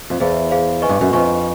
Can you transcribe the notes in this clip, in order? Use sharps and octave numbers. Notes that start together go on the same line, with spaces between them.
F2
E2 G#4 C5 F5
G#4 C5 F5
B4 D#5 G#5 C#6
G2
F#2
F2 B4 D#5 G#5 C#6